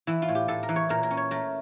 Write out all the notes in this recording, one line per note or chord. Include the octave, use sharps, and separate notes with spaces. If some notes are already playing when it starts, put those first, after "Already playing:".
E3 E4
F4
A2
G4
A2 A4
A#4
E3
C#5
A#2 A#4
A#4
C#4
C#5
A3 A#4